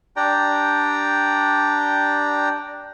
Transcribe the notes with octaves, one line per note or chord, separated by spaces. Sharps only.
D4 G4 D5 G5 A#5